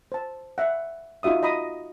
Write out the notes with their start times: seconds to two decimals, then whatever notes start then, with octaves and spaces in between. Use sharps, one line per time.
0.12 C5 A5
0.58 E5 F#5
1.23 D#4 F4 F#4 E5 D#6
1.43 D#5 A#5 B5 D#6